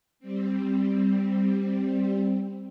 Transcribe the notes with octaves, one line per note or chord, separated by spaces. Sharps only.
G3 C4